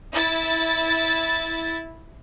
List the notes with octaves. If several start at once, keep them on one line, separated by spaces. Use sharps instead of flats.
E4 A6